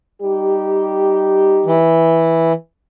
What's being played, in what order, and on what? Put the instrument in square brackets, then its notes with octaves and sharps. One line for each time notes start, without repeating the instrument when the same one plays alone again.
[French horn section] G3 D#4 G4
[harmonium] E3